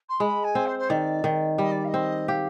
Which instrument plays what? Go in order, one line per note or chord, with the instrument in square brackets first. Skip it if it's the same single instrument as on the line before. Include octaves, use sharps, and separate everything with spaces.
[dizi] C6
[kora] G#3 [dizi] B5
[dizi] G#5
[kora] C4
[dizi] C5
C5
[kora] D#3 [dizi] D5
[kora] D#3
[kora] G3 [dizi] D#5
[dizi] D5
F5
D#5
[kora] C4
[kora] G4 [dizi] F5